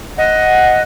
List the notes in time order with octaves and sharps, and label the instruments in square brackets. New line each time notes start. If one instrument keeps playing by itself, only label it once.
[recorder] D#5 [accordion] F#5